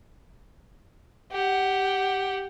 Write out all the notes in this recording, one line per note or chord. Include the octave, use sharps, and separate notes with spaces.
G4 F#5